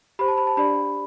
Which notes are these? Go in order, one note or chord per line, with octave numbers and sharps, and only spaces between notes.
G4 C5 B5
A5
B5
A5
D4 G4 D5 B5